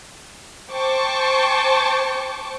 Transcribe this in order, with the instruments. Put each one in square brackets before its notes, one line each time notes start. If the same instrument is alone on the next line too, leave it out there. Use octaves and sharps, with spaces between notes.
[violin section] C5 G5 A5 C#6 D6